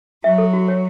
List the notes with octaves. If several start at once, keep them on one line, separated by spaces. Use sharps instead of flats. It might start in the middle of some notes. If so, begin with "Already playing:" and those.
F#3 E5
A4
F#4
C#5